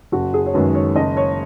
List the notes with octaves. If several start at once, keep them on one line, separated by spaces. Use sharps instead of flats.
F#1 F#4
G#4
C#5
F#2 D#3 G#3 B4
C#5
F#1 D#5
C#5